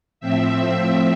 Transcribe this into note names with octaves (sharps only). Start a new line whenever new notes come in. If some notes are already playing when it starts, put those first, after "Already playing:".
A2 F3 C4 E5